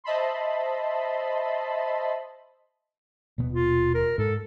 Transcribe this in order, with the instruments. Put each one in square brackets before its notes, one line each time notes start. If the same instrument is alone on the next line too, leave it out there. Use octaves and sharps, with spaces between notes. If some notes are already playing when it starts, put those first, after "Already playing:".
[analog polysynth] C5 D#5 E5 A5 B5 C6
[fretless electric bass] D#1 B2 B3
[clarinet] F4
A#4
[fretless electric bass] G#2 [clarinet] A4